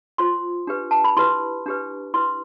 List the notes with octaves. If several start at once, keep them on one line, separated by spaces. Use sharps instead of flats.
F4 C5 C6
D4 G4 B4
A5
B5
E4 G4 B4 C6
D4 G4 B4
E4 B4 C6